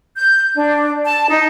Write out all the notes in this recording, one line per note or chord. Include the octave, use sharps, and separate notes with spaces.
G6
D4
A5
D#4